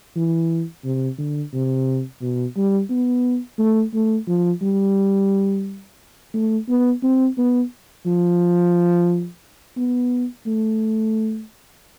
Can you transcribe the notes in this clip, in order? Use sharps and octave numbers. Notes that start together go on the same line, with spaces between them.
E3
C3
D3
C3
B2
G3
B3
A3
A3
F3
G3
A3
B3
C4
B3
F3
B3
A3